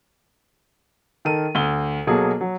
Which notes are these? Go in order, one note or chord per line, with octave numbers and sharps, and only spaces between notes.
D#3 A4 A#4 D#7
D2 G7
B2 F#3 A#3 G#4 A4
F#3